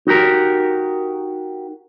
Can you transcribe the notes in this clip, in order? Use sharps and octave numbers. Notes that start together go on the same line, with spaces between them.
D#4 F#4 G4 A#4